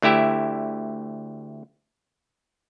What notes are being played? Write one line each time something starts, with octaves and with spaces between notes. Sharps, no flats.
D2 A3 E4 G4 E5